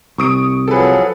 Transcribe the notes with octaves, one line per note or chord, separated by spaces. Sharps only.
C2 C#6 D#6 D7
F3 F#3 G#4 A4 B4